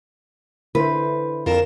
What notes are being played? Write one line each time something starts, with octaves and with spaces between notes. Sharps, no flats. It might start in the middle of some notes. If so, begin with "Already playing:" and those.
D3 E4 B4 C5
F2 F4 A#4 E7